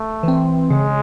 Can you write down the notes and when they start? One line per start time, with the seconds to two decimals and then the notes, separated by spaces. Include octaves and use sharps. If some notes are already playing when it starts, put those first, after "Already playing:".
Already playing: A3
0.23 E3 C4
0.70 C#3 G#3